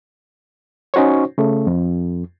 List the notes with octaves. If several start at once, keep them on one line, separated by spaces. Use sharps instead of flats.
C#4 D#4 F#4 C5 C#5
C#3 A3
F2